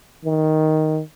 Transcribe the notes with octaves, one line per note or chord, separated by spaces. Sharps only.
D#3